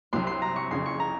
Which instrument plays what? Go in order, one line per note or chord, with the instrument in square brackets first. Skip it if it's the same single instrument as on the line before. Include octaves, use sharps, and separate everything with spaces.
[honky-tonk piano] C2 C3 F#3 [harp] C6
[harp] C6
A#5
C#6
[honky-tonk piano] F#1 F2 C#3 [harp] C6
[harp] C#6
A#5